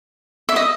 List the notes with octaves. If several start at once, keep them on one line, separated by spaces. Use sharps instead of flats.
E5
D#5